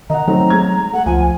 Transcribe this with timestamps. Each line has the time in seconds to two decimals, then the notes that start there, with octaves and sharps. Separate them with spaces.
0.10 D#3 D#5 F#5 A#5
0.28 F#3 A3 C4 D#4
0.50 G#3 G#6
0.93 A3 F#5
1.06 C#2 F3 G#5